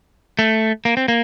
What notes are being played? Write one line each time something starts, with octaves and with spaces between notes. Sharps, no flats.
A3
A#3
C4
A#3